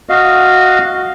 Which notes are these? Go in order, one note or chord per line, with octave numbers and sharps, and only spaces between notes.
F#4 D#5 F5